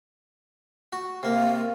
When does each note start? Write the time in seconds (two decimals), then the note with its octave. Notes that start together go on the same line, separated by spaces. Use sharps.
0.93 F#4
1.23 C3 A#3 F5